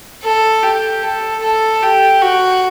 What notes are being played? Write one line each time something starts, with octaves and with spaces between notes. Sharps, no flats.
A4
G4
A4
A4
G4
F#4